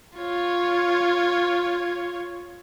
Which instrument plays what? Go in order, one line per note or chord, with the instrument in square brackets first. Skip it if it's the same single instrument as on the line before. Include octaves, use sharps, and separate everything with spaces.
[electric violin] F4 C#5